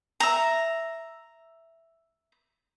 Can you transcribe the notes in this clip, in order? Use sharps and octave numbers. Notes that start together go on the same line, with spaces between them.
E5 A#5